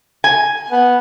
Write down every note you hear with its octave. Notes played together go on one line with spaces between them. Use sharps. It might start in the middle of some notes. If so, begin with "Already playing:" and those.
G#5
B3